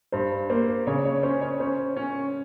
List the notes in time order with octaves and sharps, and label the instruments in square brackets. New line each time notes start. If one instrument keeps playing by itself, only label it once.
[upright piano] G2 [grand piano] C5
[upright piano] A#3 [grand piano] C5
[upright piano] C#3 [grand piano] C#5
[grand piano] C#5
[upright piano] C#4 [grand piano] C5
[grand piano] C#5
[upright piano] C#4 [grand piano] C5
[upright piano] C#4